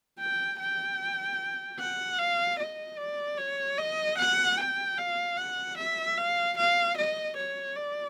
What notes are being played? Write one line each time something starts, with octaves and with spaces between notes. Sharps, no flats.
G5
G5
F#5
F5
D#5
D5
C#5
D#5
F#5
G5
F5
F#5
E5
F5
F5
D#5
C#5
D5